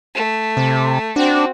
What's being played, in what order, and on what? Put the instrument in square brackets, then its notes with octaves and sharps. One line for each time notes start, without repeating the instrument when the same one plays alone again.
[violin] A3
[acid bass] C3
[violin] C4 F#4 [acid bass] D4